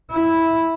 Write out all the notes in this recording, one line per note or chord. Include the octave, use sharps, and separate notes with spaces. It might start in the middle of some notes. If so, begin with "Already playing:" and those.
E4